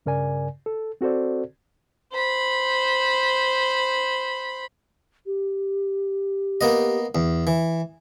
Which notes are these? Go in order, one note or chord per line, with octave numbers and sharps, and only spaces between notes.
G2 C#3 A#4 D5 G#5
A4
C4 F#4 A4 C5 D5
C5 B5
G4
A#3 B3 D#5
E2
E3